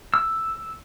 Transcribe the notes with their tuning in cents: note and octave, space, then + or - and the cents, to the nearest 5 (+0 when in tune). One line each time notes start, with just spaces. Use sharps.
E6 +5